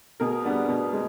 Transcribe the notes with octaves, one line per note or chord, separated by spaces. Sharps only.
B2 G#4 A#4
G3 B3 D4
B2
G#3